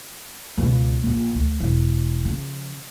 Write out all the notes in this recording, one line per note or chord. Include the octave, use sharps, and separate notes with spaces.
C#2 B2
A#1 A#2
D2
E1
C#3 F3